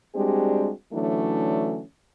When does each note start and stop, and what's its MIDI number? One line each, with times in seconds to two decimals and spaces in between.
0.16 0.71 55
0.16 0.71 56
0.16 0.71 60
0.16 0.71 62
0.16 0.71 66
0.16 0.71 67
0.93 1.82 50
0.93 1.82 52
0.93 1.82 54
0.93 1.82 57
0.93 1.82 61
0.93 1.82 62